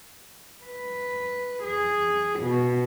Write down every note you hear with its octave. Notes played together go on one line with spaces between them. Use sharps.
B4
G#4
B2